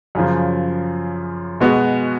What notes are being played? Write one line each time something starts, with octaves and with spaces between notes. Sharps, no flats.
F#2 C#3 F3
B2 G#3 B3 F#4